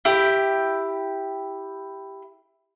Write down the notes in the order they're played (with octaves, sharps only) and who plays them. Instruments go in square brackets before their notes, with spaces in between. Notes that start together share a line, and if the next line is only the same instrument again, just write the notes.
[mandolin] E4 G4